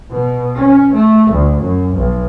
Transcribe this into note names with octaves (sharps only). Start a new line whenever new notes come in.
B2
C#4
A3
D2
F#2
B1